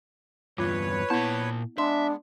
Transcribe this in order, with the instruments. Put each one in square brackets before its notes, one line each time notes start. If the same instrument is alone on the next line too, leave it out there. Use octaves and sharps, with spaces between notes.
[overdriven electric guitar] E2 G2 [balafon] F4 [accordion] B4 C#5
[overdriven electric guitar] A#2 A5 [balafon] B3 E4
[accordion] G#3 B3 [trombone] D4 [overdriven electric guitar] E5 [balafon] C6